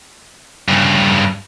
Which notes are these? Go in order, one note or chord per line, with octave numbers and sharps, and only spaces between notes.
G2 C#3